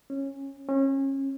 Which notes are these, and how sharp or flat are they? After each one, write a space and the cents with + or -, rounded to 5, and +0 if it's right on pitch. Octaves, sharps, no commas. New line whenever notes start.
C#4 -15
C#4 -30